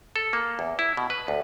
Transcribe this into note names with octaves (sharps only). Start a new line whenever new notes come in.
A4
A#3
E2
E4
B2
B4
D2